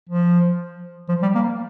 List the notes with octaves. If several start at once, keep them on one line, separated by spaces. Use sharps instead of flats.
F3
F3
G3
A#3